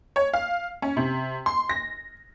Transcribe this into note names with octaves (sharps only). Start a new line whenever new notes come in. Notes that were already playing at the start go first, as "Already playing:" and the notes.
C#5
F5
C#4
C3
C6
A#6